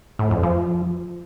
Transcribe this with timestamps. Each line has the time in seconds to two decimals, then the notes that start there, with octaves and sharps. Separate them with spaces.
0.19 A2
0.31 F2
0.43 F3